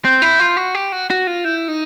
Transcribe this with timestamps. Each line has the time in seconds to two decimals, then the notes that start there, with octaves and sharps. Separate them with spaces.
0.05 C4 G6
0.22 E4
0.40 F4
0.57 F#4
0.75 G4
0.92 F#4
1.10 F#4
1.27 F4
1.45 E4 G6
1.68 D#4